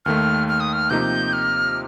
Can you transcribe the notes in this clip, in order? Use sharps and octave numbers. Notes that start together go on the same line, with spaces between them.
D#2 D#3 A3 F6
F6
D#6
F6
C3 F3 A#3 D#4 G4 G6
F6